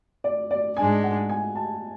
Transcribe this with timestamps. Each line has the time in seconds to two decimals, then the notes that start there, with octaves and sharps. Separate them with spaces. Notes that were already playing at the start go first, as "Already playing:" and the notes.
0.24 D5
0.51 D5
0.77 G#2 G#3 D4 G#5
1.03 F#5
1.29 G#5
1.55 A5